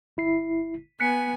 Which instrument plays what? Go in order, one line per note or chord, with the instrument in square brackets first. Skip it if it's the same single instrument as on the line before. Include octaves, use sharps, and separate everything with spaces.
[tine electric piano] G1 E4 C7
[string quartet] B3 G#5 [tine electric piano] F#6 B6 C#7